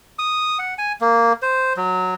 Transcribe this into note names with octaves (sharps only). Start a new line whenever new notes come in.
D#6
F#5
G#5
A#3
C5
F#3